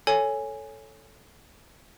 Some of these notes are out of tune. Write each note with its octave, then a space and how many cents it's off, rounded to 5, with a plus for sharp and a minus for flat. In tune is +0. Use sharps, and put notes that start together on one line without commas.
A4 +0 C#5 +0 G#5 +0